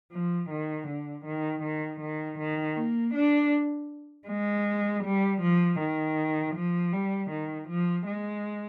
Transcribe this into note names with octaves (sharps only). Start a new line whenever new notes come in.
F3
D#3
D3
D#3
D#3
D#3
D#3
A#3
D4
G#3
G3
F3
D#3
F3
G3
D#3
F3
G#3